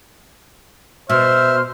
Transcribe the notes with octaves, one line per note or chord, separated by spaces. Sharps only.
B2 C5 E5 F6